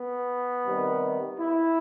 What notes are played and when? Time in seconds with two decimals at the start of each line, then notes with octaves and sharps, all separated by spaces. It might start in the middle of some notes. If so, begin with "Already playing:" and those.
Already playing: B3
0.66 C3 D#3 G3
1.40 E4